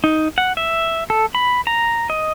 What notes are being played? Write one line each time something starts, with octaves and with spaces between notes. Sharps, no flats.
D#4
F#5
E5
A4
B5
A#5
D#5